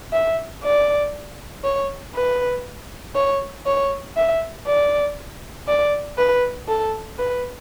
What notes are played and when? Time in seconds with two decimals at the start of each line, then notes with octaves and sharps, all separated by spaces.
0.13 E5
0.64 D5
1.64 C#5
2.15 B4
3.15 C#5
3.66 C#5
4.17 E5
4.67 D5
5.68 D5
6.18 B4
6.68 A4
7.19 B4